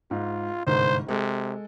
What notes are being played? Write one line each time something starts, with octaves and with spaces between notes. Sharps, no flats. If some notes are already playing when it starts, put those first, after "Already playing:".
G#2 F4
G1 C2 G#2 C5
C3 G#3 A4